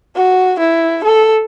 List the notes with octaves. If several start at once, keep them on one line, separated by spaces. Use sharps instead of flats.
F#4
E4
A4